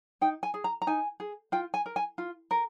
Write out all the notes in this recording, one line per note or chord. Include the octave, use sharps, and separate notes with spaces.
D#4 G5
G#5
G#4
A#5
A#5
D#4 G#5
G#4
F4 G5
G#5
A#4
G#5
F4
A#4